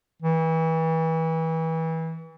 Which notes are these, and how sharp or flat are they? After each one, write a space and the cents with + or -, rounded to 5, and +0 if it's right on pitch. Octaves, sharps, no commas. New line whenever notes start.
E3 -30